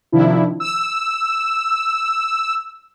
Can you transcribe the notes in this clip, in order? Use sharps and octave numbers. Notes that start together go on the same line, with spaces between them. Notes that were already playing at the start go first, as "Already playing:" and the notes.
C3 D#3 F3 D4 E4
E6